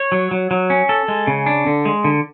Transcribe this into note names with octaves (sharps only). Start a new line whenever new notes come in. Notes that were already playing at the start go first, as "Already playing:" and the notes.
Already playing: C#5
F#3
F#3
F#3
C#4
A4
G#3
C#3
D4
D3
G#3
D3